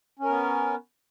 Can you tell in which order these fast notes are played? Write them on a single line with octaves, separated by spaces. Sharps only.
C#4 A#4 B3